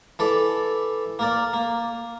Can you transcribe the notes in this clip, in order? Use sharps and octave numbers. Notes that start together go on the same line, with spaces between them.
E3 A4 D5
A#3 A#4 D5
A#3